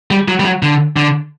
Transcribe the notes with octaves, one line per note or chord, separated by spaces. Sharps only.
G3
F#3
G3
F#3
D3
D3